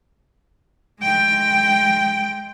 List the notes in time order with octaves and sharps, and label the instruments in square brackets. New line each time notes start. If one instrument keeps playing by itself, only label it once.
[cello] G#3 G5